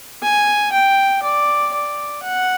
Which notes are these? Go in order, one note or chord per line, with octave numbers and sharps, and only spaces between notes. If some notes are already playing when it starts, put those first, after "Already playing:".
G#5
G5
D5
D5
F#5